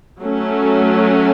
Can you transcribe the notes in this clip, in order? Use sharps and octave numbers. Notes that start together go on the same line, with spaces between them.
F#3 A3 C#4